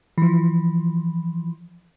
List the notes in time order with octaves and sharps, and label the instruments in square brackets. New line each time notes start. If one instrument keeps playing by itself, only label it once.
[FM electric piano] E3 F3